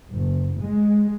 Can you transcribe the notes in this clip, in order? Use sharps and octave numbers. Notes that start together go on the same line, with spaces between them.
F#1
G#3